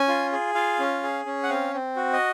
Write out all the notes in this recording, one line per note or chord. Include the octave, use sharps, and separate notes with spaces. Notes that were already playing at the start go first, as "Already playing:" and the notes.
Already playing: C#4 G#5
F4
G#4
F4 F5
C#4
G#4
C#4
F#5
C4 F5
C4
F#4
D#5